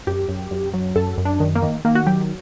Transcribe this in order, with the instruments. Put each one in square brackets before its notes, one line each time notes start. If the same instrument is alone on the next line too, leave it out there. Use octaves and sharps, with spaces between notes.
[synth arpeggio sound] F#2 G4
F#2
F#2
F#3
F#2 A4
F#2
D4
D#3
A#3
D#3
D#3 A#3
F#4
F#3 G4